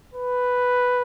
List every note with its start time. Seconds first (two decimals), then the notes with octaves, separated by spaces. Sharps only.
0.14 B4